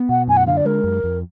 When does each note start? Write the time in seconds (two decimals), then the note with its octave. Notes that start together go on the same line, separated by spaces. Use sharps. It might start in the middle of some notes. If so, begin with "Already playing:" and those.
Already playing: B3
0.09 B2 F#5
0.28 F#2 G#5
0.37 F#5
0.47 D3 F5
0.57 D5
0.65 G#3 A#4
0.84 F#2
1.04 F2